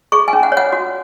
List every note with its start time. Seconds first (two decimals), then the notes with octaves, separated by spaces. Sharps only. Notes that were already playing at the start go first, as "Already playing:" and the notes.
0.12 G#4 C#6
0.28 G#5
0.33 C#4
0.43 F#5
0.52 C#5
0.57 F#5
0.72 F#4